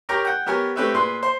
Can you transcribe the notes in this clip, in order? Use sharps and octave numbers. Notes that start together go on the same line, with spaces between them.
G4 A#4 C#5 G5 A#5 D6
F#5 G5
B3 G4 A#4 C#5 G#5
A3 C4 G4 B4 C#5 E5
A#2 G#4 B4 C6
C5